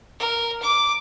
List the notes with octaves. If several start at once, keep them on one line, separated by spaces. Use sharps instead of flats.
A#4
D6